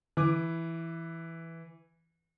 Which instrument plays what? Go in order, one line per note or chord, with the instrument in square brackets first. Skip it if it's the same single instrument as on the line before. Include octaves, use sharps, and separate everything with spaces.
[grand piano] E3 D6